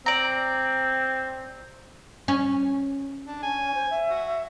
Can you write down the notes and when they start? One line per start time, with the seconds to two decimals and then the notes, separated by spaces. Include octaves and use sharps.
0.06 C4 D5 A#5
2.28 C#4
3.27 D4
3.43 C#4 G#5
3.74 C5
3.90 E5
4.10 F#4